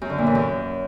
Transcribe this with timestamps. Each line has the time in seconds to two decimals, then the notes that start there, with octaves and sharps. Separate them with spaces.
0.01 F#2
0.10 D3
0.18 A#2
0.27 E3
0.35 F#2